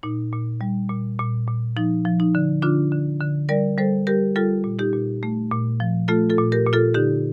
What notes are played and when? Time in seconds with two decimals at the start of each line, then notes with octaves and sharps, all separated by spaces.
0.03 A#2 D#4
0.33 A#2
0.61 G3
0.90 A#2
1.19 A#2
1.48 A#2
1.77 F3 D#4
2.05 F3
2.20 D#4
2.35 D3
2.62 D3 D4 F4
2.92 D3
3.21 D3
3.49 G3 A#4 D5
3.78 G3 A4 C5
4.07 G3 G4 A#4
4.36 G3 F4 A4
4.64 A#2
4.79 D#4 G4
4.93 A#2
5.23 A3
5.51 A#2
5.80 F3
6.08 A3 F4 A4
6.30 F4 A4
6.38 A#2
6.52 G4 A#4
6.67 A#2
6.73 F4 A4
6.94 D3 D#4 G4